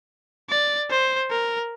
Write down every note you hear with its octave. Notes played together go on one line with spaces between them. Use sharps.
D5
C5
A#4